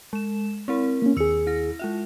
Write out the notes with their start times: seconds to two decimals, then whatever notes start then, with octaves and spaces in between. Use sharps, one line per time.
0.13 G#3 E7
0.68 C4 E4 A#4
1.02 A#3 C#4
1.17 D#2 G#4 E6 C#7
1.47 E4 A#6
1.79 G#3 F4 E5